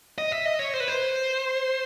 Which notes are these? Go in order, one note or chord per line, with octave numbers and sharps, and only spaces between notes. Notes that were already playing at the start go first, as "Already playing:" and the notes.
D#5
E5
D#5
C#5
C5
B4
C5